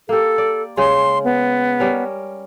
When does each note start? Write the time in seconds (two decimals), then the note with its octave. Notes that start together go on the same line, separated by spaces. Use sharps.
0.09 A#3 G4 A4
0.38 D5
0.77 C#3 G#3 C6
1.24 B3
1.80 G3 C#4 A#4